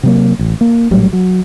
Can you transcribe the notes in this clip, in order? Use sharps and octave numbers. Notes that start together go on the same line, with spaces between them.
C3 F#3 A#3
A1
A#3
A#1 A2 F#3 G3
F#3